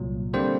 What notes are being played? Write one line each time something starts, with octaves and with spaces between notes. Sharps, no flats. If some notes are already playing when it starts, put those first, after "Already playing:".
Already playing: C2 A#2 F#3
D3 G3 A#3 C4 C5